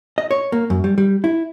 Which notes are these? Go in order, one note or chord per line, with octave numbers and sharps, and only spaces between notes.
D#5
C#5
A#3
F#2
G3
G3
E4